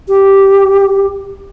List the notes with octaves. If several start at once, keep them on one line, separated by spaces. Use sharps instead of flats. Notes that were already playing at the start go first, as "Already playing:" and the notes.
G4